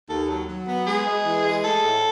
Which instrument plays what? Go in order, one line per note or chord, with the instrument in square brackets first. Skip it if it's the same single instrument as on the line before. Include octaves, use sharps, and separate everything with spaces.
[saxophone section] D#2 [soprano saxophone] A4
[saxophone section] F#3
F#3
B3
[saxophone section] G#3 [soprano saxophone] G#4
[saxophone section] G#3
E3
G#3
[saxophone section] A3 [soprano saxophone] A4
[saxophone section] A2